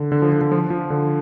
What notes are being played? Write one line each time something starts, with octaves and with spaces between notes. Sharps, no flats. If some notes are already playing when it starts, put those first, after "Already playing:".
Already playing: D3
D3
F3
F3
D3
F3
F3
D3